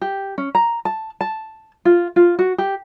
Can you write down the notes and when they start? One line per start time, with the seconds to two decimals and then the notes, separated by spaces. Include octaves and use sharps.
0.02 G4
0.38 C#4
0.55 A#5
0.85 A5
1.21 A5
1.85 F4
2.16 F4
2.39 F#4
2.58 G4